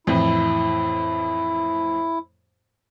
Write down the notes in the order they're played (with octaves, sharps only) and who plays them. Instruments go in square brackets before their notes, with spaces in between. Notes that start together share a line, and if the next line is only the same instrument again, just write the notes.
[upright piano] F2 A2 E3 [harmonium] E4